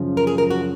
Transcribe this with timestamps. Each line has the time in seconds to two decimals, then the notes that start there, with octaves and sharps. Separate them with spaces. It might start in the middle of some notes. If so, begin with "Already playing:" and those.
Already playing: F#2 C#3 F3
0.17 A#4
0.27 G#4
0.38 A#4
0.50 F#4